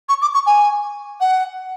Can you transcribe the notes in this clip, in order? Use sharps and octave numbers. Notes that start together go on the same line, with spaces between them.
C#6
D6
C#6
G#5
F#5